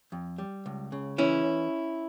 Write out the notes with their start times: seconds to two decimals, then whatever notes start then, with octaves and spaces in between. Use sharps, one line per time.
0.12 F2
0.38 G3
0.66 C#2
0.92 C#3
1.18 E3 C#4 E4